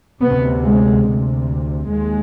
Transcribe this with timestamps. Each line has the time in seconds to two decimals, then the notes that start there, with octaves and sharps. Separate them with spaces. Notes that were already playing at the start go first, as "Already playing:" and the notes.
0.22 D2 C3 B3
0.65 G#3
1.06 D2 C3
1.91 D#2 G#3